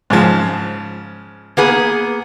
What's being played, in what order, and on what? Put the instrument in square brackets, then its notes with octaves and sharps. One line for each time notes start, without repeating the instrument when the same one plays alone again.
[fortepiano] G#2 C#3 F3
[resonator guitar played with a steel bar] A#3 B3 G#4